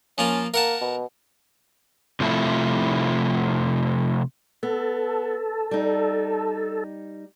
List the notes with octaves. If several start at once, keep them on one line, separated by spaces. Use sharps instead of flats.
F3 A#3 C#4 F4
A#3 A#4 F#5 A5
B2
C3 F3 A3 E4
B3 A4
G3 D#4